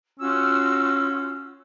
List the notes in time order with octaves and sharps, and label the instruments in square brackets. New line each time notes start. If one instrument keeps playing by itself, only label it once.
[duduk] C#4 [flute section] F4 F#4 E6